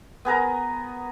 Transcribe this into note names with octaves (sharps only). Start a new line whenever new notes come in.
B3 G#4 A#4 A#5